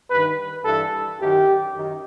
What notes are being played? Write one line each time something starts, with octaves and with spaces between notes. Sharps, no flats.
G2 D#3 B4
G2 E3 A4
F#2 D#3 G4
F#2 D#3